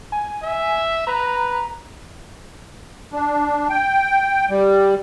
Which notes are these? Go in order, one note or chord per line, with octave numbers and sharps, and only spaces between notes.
G#5
E5
B4 A#5
D4
G5
G3